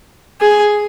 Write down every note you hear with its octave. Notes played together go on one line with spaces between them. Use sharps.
G#4